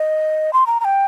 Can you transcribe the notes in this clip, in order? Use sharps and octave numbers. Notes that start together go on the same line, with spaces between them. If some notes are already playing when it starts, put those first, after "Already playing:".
Already playing: D#5
C6
A#5
A#5
G5